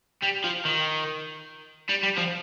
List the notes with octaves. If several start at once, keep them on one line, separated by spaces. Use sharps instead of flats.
G3
F3
D#3
G3
G3
F3